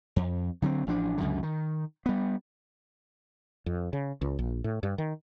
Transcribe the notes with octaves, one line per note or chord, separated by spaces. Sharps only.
F2
D3 F#3 B3 C4
A1 F3 D4
C#2 F#2 D3
D#3
G3 B3
F2
C#3
C#2
A#1
A2
G2
D#3